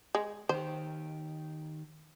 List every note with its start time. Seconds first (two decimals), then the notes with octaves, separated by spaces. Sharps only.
0.15 G#3
0.49 D#3 G4 C5